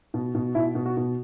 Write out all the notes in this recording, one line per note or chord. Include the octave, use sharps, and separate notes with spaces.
B2
B2
B2 E4
B2
F#4
B2